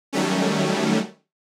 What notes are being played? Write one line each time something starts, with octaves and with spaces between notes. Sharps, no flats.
D#3 F#3 G3 A3 C#4